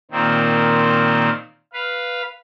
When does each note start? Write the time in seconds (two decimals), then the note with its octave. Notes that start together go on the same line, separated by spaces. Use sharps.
0.11 A#2 D#3 C4
1.73 B4 F5